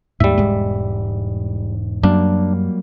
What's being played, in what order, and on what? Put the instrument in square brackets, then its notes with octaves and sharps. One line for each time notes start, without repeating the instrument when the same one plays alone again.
[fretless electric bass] D#2 G#2 [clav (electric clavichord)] G3 E5
[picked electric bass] E1 G#2 [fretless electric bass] G#3
[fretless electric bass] F#2 [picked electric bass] F#3 G3 A#3 [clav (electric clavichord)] D4